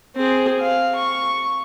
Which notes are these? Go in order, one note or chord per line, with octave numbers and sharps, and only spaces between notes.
C4 G#4
F5
C#6